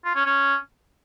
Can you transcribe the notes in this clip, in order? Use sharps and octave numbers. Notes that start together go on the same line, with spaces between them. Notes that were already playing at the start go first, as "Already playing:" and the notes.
F4
C#4
C#4